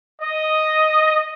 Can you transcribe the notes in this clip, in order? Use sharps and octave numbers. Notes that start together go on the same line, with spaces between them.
D#5